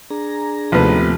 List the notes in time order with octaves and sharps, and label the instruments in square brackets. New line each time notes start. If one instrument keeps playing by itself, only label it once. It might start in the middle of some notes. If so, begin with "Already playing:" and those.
[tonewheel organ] D4 G#4 A#5
[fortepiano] A1 B3 B4 [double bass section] D#2 C3 [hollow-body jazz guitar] F3 A3